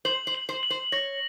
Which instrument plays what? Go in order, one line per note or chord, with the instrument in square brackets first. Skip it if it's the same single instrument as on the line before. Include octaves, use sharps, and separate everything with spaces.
[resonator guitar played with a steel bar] C5 [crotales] F#7
[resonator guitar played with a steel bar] C5
[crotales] F#7
[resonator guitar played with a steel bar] C5
[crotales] F#7
[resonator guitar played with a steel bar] C5
[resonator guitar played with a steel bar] C#5 [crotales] A#6